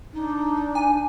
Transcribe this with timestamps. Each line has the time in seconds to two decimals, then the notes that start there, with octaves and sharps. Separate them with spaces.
0.13 D4 D#4
0.75 G#5